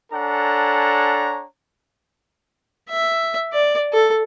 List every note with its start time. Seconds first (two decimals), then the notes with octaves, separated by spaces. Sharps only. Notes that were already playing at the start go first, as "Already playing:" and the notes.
0.12 D4 A4 C#5 F#5 G#5 A#5
2.89 E5
3.53 D5
3.93 A4